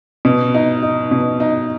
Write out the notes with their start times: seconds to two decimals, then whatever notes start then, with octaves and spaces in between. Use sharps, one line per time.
0.25 B2
0.54 D#4
0.83 D#4
1.11 B2
1.40 D#4